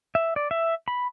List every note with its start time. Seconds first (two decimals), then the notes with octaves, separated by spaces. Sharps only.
0.15 E5
0.36 D5
0.51 E5
0.88 B5